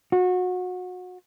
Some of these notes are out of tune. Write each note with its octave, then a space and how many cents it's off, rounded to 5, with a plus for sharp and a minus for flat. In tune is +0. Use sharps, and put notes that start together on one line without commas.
F#4 -25